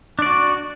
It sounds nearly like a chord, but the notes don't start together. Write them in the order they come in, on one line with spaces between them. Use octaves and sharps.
D4 D5 F#4